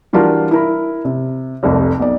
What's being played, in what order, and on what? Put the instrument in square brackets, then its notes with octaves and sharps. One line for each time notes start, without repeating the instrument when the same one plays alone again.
[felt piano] E3 G3 D4 F4 F#4 A#4
E4 A#4 B5
C3
F1 C2 F2
B1 D5